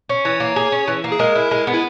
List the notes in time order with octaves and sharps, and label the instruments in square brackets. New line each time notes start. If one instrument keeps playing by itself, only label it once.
[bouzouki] C#4
[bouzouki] E3 [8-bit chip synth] C#5
[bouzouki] A#3
G#4
C#4
E3
A#3
[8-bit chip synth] G#4
[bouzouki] G#3 [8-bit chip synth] A#4
[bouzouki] E4
G#3
B3
[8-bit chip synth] E4